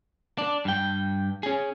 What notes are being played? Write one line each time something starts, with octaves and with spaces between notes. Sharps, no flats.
D4
G2 G5
C#4 G#4